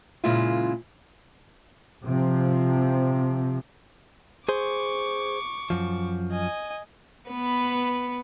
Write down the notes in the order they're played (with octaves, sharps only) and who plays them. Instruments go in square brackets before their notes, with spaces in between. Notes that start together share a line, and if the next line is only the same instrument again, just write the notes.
[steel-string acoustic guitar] F#2 A#2 C#3 G#3 E4 F4
[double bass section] C3 F3
[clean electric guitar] G#4 C5 [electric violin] C#6 D6
[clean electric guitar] F#2 F3
[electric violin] D#5 G#5
[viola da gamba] B3 B4